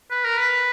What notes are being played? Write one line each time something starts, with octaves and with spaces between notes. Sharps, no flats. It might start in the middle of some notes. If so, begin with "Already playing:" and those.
B4
A#4
B4